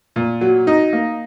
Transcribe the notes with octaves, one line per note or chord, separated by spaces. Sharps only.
A#2
F#3
D#4
A#3